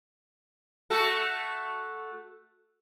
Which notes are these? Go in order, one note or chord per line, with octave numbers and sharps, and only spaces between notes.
A3 F#4 A4